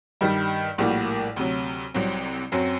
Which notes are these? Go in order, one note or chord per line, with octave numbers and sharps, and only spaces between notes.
G2 D#3 G3
A#1 A2 G3 A#3 F#4
D2 C3 F#3
C2 C3 F#3 C4
F#2 F#3 C4